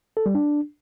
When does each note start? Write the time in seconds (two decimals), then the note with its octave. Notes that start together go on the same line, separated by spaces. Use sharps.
0.17 A4
0.26 G3
0.35 D4